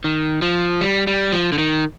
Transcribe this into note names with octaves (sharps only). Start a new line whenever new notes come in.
D#3
F3
G3
G3
F3
D3
D#3